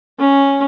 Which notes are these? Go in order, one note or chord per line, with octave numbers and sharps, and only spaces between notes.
C#4